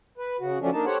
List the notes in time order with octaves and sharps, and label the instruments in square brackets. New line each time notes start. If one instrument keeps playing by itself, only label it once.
[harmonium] B4
C#3 F#4
D2 F3 F#3 A3 C#4 D4
A#3 D4 D#4 A5
G4 A4 C5 C#5 F#5